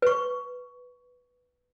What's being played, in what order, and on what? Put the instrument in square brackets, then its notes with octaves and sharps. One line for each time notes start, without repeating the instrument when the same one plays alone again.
[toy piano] B4 C#6